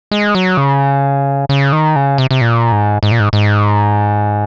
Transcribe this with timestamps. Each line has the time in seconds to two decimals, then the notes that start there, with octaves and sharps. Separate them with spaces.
0.11 G#3
0.35 F#3
0.57 C#3
1.49 C#3
1.72 D#3
1.96 C#3
2.18 C3
2.31 C3
2.41 A#2
2.72 G#2
3.03 G#2
3.12 A#2
3.20 G#2
3.33 G#2